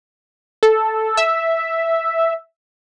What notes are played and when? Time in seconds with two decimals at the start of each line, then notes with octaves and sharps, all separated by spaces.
0.63 A4
1.17 E5